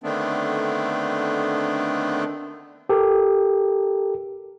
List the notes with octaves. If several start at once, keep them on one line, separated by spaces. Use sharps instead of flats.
D3 D#3 A3 B3 C4 D4
G4 A4 A#4